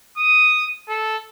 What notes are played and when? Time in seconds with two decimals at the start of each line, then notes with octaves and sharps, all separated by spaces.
0.17 D#6
0.89 A4